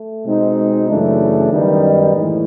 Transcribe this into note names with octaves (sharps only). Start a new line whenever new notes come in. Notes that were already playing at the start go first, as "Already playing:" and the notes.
Already playing: A3
B2 G#3 C4 D#4
F#2 C#3 E3 A3 D4
F#2 D#3 G3 B3 D#4
A2 E3 G#3